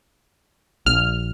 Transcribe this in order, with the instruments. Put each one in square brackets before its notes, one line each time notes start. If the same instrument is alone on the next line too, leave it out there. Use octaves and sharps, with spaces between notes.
[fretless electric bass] A#1 [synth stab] F6